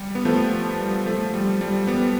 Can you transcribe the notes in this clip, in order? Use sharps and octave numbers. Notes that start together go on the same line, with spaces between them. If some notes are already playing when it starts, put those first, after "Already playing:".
Already playing: G3
B3
F3 A3
G3
F3 A3
G3
G3
G3 B3